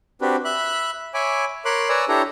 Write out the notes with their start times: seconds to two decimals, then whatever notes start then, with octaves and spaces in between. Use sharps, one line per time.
0.21 C4 D4 F#4 G4 B4
0.45 E5 B5 F#6
1.14 C#5 E5 G#5 B5 D6
1.65 A#4 C#5 B5 C6 D6 F#6
1.89 B4 C#5 D5 G#5 A#5 E6
2.08 D4 E4 G4 A4 C#5 A#5